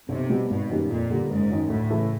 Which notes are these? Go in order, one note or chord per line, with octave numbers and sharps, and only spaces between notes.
B1 C3
B2 G3 B3
G#1 B2
F#2 D#3 G3 A#3
F2 A#2
D3 G3 A#3
F#1 G#2
F#2 D#3
D2 A2
C#3 E3 A3